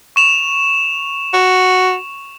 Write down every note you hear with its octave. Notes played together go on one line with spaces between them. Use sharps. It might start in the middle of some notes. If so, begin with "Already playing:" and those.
C#6 E7 F7
F#4